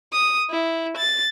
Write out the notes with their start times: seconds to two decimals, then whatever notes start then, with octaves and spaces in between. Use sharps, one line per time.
0.13 D#6
0.50 E4
0.97 A6